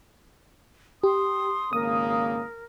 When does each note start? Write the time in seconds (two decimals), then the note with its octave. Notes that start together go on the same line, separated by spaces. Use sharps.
1.04 G4 C6 D#6
1.73 G#1 C#3 A#3 A#4 D#6